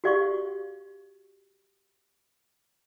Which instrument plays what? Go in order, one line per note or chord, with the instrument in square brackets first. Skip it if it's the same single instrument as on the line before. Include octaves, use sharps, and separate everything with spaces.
[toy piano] F#4 G4 D5 F5 C6 C#6